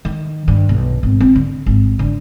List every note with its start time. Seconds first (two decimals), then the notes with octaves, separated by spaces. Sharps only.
0.05 D#3
0.48 G2
0.69 B1
1.03 G#1
1.20 C4
1.35 D3
1.66 G#1
1.99 D3